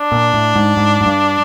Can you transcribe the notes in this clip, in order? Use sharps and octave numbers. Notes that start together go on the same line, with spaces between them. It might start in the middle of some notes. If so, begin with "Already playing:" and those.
Already playing: D4
A#2
A2
G#2
G#2
G#2
G2